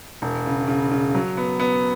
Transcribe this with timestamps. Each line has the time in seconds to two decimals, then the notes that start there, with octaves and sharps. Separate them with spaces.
0.22 E1
0.46 C#3
0.68 C#3
0.91 C#3
1.15 F#3
1.37 B3
1.60 B3